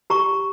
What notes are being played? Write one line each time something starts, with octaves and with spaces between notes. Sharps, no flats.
G4 A#5 C#6